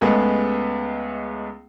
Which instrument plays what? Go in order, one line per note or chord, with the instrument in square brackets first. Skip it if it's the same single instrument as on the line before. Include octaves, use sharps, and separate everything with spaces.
[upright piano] C#2 G#3 A3 B3